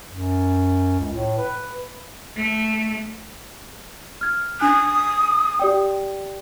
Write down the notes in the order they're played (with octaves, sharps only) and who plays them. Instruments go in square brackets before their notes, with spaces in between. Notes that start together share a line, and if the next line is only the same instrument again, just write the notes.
[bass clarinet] F#2
C#2
A2
B4
[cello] A3
[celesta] F6 G#6
[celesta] D4 G#5 F#6 [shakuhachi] D#6
[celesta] G4 D5 G5